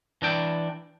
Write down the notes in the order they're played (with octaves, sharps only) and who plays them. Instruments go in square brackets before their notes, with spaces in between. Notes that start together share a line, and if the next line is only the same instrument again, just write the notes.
[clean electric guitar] E3 D4 G5